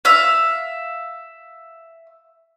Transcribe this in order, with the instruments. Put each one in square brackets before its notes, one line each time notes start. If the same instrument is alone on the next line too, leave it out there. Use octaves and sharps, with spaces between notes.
[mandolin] E5 F5